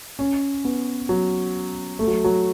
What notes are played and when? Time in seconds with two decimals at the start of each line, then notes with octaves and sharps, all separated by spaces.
0.19 C#4
0.65 B3
1.09 F#3
1.99 A3
2.07 F#3
2.24 F#3